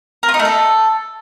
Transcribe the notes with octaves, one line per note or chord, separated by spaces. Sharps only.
A#4
F4
D#4
A3
A4